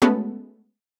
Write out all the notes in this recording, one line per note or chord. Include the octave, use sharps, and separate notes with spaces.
G#3 A3 B3 C#4 F#4 A4